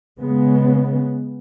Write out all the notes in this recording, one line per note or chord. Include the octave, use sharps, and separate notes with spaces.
C#3 G#3 B3